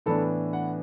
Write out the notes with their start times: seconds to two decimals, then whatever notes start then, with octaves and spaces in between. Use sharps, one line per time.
0.06 A2 E3 B3 D4 A4
0.53 F#5